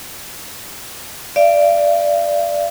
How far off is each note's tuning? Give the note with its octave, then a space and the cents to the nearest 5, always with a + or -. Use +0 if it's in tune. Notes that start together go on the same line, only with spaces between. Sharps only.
D5 +0 F5 -45